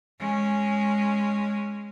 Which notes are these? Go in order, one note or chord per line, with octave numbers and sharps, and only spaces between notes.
G#3 C#4